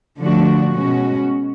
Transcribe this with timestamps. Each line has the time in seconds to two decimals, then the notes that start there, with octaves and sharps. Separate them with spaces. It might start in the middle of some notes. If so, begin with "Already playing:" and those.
0.19 D3 F3 A3 D4 F#4
0.73 B2 G#3 C#4 F#4